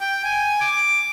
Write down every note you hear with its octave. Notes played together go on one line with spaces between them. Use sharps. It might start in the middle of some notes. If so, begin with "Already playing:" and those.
G5
G#5
D6